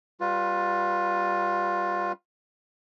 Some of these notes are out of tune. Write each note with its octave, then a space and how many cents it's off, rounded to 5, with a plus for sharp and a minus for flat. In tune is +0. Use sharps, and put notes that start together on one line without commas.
G3 +0 F4 +20 B4 +0